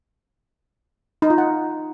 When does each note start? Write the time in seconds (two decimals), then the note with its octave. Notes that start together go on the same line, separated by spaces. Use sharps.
1.22 D#4
1.30 F4
1.38 F#5